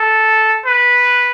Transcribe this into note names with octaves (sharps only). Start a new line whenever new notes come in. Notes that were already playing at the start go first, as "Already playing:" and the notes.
Already playing: A4
B4